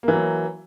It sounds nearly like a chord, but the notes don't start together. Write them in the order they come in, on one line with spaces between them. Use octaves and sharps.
A#3 E3 F#3